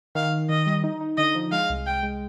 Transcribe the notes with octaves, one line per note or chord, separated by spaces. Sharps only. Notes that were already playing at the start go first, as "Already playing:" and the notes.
D#3 F5
D#3
D#3 D#5
G3
D#4
D#4
D3 D#5
F3
G#3 F5
C2
C2 G5
G#3